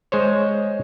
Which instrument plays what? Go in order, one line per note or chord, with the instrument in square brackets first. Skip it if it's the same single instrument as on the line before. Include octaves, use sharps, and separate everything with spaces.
[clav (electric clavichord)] G#3 C5 C#5